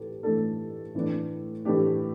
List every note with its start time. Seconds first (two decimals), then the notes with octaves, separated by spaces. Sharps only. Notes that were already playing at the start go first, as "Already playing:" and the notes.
Already playing: A2 E3 G4 A4 B4
0.23 A2 E3 A3 D4 A4
0.95 A2 E3 A3 D4
1.65 A2 E3 A3 D4 G4